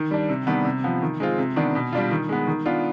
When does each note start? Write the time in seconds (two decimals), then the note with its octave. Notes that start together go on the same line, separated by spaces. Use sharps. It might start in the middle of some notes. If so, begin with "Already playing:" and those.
Already playing: D#3
0.11 G3 D4
0.29 C3
0.47 D#3 G3 B3 D4
0.65 C3
0.84 F3 B3
1.02 D#3
1.20 G#3 C4 F4
1.38 C3
1.56 D#3 B3 D4
1.75 B2
1.93 G3 D4 F4
2.11 D#3
2.29 G#3 B3
2.47 D#3
2.66 B3 D4 F4